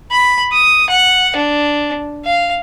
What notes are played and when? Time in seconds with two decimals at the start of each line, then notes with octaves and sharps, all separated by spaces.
0.11 B5
0.53 D#6
0.90 F#5
1.36 D4
2.25 F5